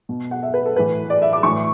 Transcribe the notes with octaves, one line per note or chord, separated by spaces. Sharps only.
B2
F#5
E5
B4
A4
A2 E3 B4
D5
E5
D6
A2 E3 C#6